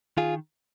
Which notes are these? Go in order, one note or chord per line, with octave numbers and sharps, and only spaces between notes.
D#3 F4 G#4